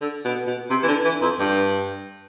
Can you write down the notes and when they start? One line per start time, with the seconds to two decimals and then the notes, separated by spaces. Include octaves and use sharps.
0.01 D3
0.25 B2
0.47 B2
0.70 C3
0.83 E3
0.88 D3
1.04 E3
1.22 F2
1.39 G2